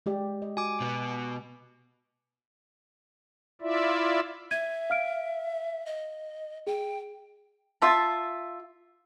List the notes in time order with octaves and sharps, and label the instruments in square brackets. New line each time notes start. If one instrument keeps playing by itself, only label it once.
[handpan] G#3 G4 D5
D#5
[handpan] F#4 [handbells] G#5 D6
[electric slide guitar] B2 B3
[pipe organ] E4 F4 D5 E5
[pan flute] E5 [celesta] G#6 D#7
[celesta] F5 F6 D7
[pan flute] D#5
[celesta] G#4 [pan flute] G5
[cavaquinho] F4 E5 A5